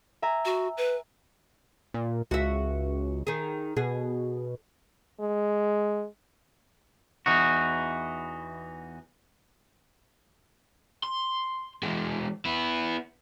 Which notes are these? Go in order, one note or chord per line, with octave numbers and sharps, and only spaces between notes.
E5 G#5 A#5
F#4
B4
A#2
C#2 F#4 E5
D#3 G#4
B2 G#4
G#3
E2 E3 D#4 F#4
C6
E3 G#3
B3 E4